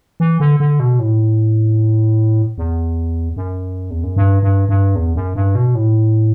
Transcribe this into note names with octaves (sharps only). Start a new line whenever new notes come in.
E3
D3
D3
B2
A2
E2
F#2
E2
F#2
G2
G2
G2
E2
F#2
G2
B2
A2